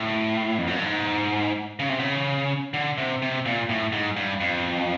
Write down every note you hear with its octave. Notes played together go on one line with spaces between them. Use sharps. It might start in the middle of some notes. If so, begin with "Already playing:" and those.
Already playing: A2
F2
F#2
G2
G#2
C#3
C3
C#3
D3
C3
C3
A#2
A2
G#2
G2
F2